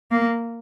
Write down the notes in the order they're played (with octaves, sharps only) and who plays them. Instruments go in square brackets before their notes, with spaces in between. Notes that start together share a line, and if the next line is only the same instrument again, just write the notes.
[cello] A#3